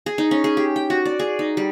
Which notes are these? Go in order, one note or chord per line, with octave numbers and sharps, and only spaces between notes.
G#4
D#4
C#4
G#4
G4
G5
F#4
D5
G#4
D#4
G3